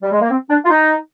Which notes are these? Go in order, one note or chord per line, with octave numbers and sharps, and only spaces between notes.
G3
G#3
A#3
C4
D4
F4
D#4